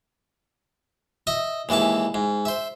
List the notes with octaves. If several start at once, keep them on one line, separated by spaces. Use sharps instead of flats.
D#5 E5 D#6
D#2 E3 G#3 E5 A5
G#2
C5 E5